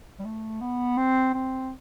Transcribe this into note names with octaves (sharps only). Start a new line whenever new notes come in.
G3
A3
B3
C4
C4